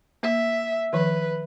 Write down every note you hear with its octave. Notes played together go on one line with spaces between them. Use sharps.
A#3 E5
D#3 F3 B4